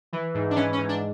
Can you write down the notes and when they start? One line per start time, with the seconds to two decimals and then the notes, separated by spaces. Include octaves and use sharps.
0.13 E3
0.34 G#2
0.50 D4
0.56 E3 C#4
0.72 C#4
0.78 G#2
0.89 D4